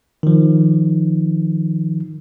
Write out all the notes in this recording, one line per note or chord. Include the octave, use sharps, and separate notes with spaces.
D#3 F3